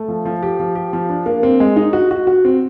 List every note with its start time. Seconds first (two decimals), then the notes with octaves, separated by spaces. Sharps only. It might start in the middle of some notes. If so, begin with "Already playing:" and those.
Already playing: A3
0.08 F3
0.25 F3
0.43 G4
0.60 F3
0.75 G4
0.93 F3
1.10 D4
1.26 A#3
1.43 C4
1.60 G#3
1.76 D#4
1.93 F#4
2.11 F#4
2.27 F#4
2.45 C4